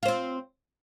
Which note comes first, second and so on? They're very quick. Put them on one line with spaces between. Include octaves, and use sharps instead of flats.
F4 C5 C4